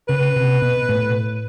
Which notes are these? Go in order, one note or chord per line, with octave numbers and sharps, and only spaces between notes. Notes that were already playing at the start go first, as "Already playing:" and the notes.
C#3 B4
C3
B2
A2